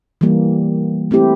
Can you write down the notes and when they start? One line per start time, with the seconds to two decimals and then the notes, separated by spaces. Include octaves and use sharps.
0.21 E3 G3 A#3
1.11 A3 C4 E4 G4